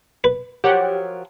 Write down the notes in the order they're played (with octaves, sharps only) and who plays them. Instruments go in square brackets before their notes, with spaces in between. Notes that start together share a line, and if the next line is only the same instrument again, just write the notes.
[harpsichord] B4
[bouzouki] F3 F#3 A#4 [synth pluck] G4 F#5